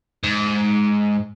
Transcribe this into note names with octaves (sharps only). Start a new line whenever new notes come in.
G#2